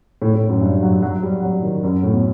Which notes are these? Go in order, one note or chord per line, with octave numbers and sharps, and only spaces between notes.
A2
A2
F#2
G2
F#3
F#3
G3
F#3
D#3
F#2
A2
B2